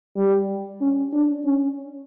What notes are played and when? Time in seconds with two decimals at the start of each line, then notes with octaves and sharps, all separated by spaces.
0.16 G3
0.81 C#4
1.13 D4
1.45 C#4